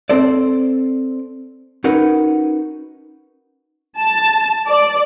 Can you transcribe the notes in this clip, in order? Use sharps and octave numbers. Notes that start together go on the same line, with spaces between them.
C4 A4 C5 D5
C#4 D#4 F#4 A#4 B4
A5
D5